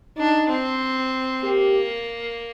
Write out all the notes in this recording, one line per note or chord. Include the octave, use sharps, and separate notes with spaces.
D4 D#4
C4
A#3 G4